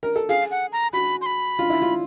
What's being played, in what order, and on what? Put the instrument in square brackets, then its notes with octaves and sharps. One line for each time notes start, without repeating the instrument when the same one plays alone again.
[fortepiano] A#4
A4
[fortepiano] G#4 [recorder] F5
[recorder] F#5
A#5
[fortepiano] F#4 [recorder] B5
[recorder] C6
B5
[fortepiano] F4
E4
F4